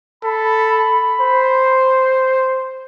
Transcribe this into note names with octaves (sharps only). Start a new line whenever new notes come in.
A4 B5
C5